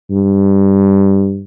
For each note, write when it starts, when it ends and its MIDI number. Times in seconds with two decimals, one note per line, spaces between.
0.11 1.42 43